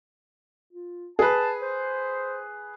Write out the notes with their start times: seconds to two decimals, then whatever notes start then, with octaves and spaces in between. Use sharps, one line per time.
0.73 F4
1.19 G#4 B4 A5
1.62 C5